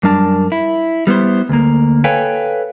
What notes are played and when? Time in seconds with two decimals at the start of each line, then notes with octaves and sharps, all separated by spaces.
0.03 F#2 G3 D4 A#4 A5
0.52 E4
1.07 G3 B3 E4 C5
1.49 D2 A#3
2.04 A4 B4 C#5 F5 G5 G#5